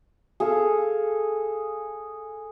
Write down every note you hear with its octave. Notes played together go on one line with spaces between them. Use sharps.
G#4 A4 F5